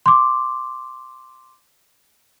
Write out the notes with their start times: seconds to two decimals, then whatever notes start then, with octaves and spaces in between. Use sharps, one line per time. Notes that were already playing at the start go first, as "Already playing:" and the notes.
0.06 C6 D6